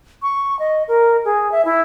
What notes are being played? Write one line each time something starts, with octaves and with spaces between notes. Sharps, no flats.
C#6
D#5
A#4
G#4
E5
E4